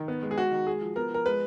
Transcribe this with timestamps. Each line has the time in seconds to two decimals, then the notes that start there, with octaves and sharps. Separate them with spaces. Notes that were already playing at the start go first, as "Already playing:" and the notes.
Already playing: D#3
0.08 B3
0.23 G#3
0.31 G#4
0.37 G#3 F#4
0.52 D#3
0.66 G#3 G#4
0.81 F3
0.96 B3 A#4
1.10 F3 A#4
1.26 G#3 B4